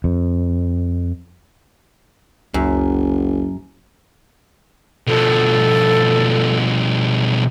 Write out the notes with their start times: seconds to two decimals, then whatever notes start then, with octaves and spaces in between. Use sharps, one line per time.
0.04 F2
2.54 F#1 C#2 F#2
5.07 B2 F3 A4